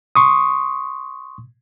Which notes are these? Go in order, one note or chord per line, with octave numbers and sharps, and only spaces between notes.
C6 C#6 D#6